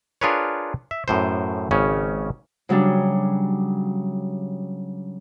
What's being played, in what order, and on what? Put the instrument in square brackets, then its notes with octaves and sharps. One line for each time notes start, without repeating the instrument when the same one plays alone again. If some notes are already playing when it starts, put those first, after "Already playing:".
[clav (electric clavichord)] D4 F4 G#4 A#4 B4 C#5
E5
F#2 A2 C5
G#1 C#3 C#4
[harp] C#3 F#3 G3 D4